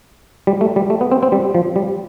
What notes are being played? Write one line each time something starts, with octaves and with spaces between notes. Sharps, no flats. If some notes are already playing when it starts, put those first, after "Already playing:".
G3
A3
G3
A3
B3
C4
C4
G3
F3
G3